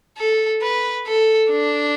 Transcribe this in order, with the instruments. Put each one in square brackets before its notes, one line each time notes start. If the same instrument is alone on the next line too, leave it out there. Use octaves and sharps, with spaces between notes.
[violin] A4
B4
A4
D4